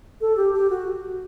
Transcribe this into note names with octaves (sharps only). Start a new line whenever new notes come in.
A4
G4
G4
F#4